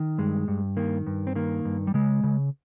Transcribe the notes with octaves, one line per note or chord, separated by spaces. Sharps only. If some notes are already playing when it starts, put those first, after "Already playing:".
Already playing: D#3
G2 G#3
G2
D#3 A#3
G2
C4
D#3 A#3
G2
G3
C#3 G#3
C#3